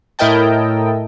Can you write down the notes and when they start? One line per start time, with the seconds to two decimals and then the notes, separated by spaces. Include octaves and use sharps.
0.19 A2 E4 A#4 D#5 G5 A5